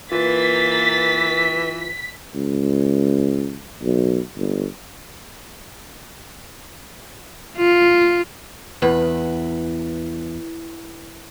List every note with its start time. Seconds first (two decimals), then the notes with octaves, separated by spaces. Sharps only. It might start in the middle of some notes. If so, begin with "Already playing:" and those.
0.12 E3 A#3 F4 B4 A6 B6
2.35 C#2
3.83 B1
4.37 G1
7.57 F4
8.82 E2 B4